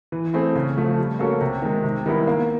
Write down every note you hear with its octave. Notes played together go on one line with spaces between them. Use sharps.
E3
A3 C4 E4 G#4
C#3
F3 A3
G3
A#3 C#4 F#4 A4
C3
D#3 G#3
C3
D#3 G3 B3 E4
A#3